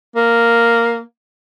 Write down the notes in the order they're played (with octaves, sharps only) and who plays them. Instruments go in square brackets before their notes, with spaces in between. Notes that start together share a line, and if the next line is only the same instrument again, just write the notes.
[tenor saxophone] A#3